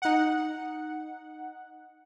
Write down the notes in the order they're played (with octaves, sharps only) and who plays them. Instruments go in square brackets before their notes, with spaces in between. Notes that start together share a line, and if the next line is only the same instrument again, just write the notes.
[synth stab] D#4 F#5